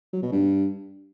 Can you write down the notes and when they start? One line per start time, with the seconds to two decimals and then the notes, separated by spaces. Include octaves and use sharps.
0.13 F#3
0.22 B2
0.32 G2